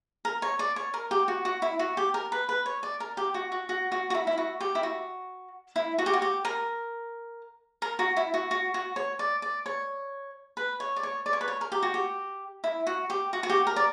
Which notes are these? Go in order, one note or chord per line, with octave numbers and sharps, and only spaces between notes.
A#4
C#5
D5
C#5
A#4
G4
F#4
F#4
E4
F#4
G4
A#4
B4
B4
C#5
D5
A#4
G4
F#4
F#4
F#4
F#4
F#4
E4
E4
F#4
G4
E4
F#4
E4
F#4
G4
F#4
G4
A#4
A#4
F#4
E4
F#4
F#4
F#4
C#5
D5
D5
C#5
B4
C#5
D5
C#5
D5
C#5
B4
C#5
A#4
G4
F#4
G4
E4
F#4
G4
F#4
F#4
G4
A#4
D5